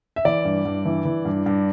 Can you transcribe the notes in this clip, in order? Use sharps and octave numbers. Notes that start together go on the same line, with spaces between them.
E5
E3 D5
G2
G2
E3
E3
G2
G2